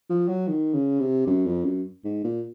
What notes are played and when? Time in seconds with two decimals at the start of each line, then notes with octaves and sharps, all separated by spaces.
0.10 F3
0.28 F#3
0.48 D#3
0.74 C#3
1.00 C3
1.27 F#2
1.46 F2
1.65 F#2
2.04 G#2
2.24 A#2